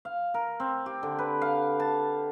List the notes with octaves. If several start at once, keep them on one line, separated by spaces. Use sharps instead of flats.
F5
A#4
C4
G4
D3
B4
F5
A5